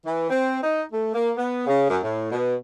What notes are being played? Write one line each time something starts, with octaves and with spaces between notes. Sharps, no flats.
E3
C4
D#4
A3
A#3
B3
C#3
F#2
A2
B2